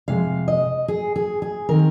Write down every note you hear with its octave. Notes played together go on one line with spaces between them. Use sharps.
F2 C3 G#3 F5
D#5
G#4
G#4
G#4
D#3 C4 A#4